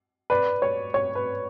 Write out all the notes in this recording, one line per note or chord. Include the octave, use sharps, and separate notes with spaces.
B4 D5
C#5
C#5
B4